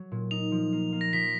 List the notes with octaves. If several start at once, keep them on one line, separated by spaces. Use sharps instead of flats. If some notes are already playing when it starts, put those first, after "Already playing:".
Already playing: F#3
A#2
D#4 F7
F3
A#3
A#3
A#6
F3 B6